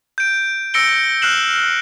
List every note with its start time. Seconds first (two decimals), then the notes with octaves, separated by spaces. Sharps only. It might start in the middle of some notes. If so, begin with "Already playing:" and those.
0.18 G6 D7
0.74 E6 A#6 C#7 D7 G7
1.22 F6 F#6 C7 E7 F#7